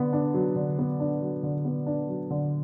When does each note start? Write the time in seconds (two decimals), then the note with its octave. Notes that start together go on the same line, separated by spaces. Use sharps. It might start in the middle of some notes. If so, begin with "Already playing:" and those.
Already playing: D3 B3
0.13 D4
0.34 F#3
0.56 D3
0.79 B3
1.00 D4
1.22 F#3
1.43 D3
1.65 B3
1.86 D4
2.08 F#3
2.30 D3